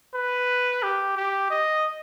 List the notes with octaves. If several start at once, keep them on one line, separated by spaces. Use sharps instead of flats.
B4
G4
G4
D#5